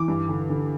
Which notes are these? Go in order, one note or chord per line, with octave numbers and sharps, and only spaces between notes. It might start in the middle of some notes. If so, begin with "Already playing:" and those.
Already playing: E3 D6
G2
D3
D3